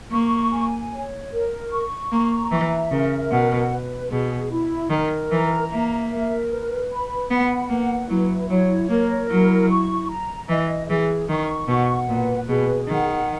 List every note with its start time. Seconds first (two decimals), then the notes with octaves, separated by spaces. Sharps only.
0.11 A#3 C#6
0.52 G#5
0.92 C#5
1.31 A#4
1.71 C#6
2.11 A#3 A#5
2.51 E3 E5
2.91 C#3 A#4
3.31 B2 F#5
3.71 B4
4.11 B2 G#4
4.51 E4
4.90 D#3 A#4
5.31 E3 A#5
5.70 A#3 E5
6.10 A#4
6.50 B4
6.90 B5
7.30 B3 F#5
7.70 A#3 B4
8.09 F#3 E4
8.50 F#3 C#5
8.89 A#3 A#4
9.29 F#3 E4
9.70 C#6
10.09 A#5
10.49 E3 D#5
10.89 E3 G#4
11.29 D#3 C#6
11.68 B2 F#5
12.08 A#2 B4
12.49 B2 G#4
12.88 D#3 F#5